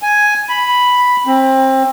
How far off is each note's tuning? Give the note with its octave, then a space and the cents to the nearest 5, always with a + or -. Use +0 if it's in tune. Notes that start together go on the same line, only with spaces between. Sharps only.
G#5 +5
B5 +0
C4 +25